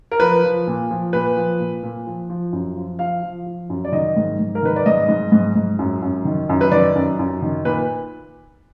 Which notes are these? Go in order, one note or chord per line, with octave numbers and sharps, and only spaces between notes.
A#4
F3 B4
F3
A#2
F3
A#2 B4
F3
A#2
A#2
F3
F3
F#2
F3
F3 F5
F3
F3
F#2
D5
D#3 D#5
G#2
G#2
A#4
D#3 B4
D5
G#2 D#5
G#2
G#2
G#2
F#2
F#2
D#3
F#2
B4
D#3 D5
F#2
F#2
D#3
A#2 B4